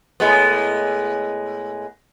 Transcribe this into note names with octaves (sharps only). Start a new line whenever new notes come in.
A2 G#3 B3